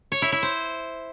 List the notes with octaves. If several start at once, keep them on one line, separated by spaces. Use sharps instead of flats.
C#5
E4
E4
C5